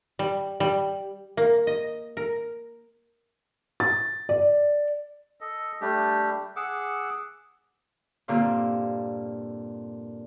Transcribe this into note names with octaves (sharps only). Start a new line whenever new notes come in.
G3
G3
A#3
D#5
A#4
A6
D5
A4 D#5
G3 A3 D4 G4
G#4 F#5 D6 E6
G2 A#2 D3 A#3 C4 F4